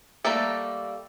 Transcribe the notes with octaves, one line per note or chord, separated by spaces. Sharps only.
G3 A3 A#3 A4